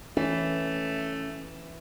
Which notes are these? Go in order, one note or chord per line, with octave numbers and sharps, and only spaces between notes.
E3 A3 C#4